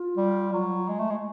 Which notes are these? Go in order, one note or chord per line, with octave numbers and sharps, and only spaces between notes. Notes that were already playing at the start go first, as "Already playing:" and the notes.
Already playing: F4
G3
F#3
G#3
A3
G#3